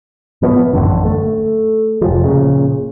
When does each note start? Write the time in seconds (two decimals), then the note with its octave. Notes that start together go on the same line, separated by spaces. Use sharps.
0.42 A2 F3 B3
0.73 A1 F#2 D3
1.05 A3
2.01 F1 F3
2.24 A#2 C#3